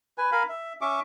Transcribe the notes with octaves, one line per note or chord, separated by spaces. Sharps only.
B4 G#5
A#4 F5 G#5 B5
E5
C#4 E5 C#6 D6